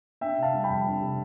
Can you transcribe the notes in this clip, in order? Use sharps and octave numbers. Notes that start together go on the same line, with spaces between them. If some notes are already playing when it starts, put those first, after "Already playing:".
D4 E5 G5
C3
F5 A5
G3
G5 B5
F2
D4
C3